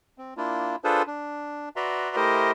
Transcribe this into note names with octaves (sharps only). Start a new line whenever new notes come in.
C4
A#3 D4 E4 F4
D4 F4 G#4 A4 B4 C5
D4
F#4 B4 D5 E5 A#5 C6
A3 E4 G4 A#4 C5 D#5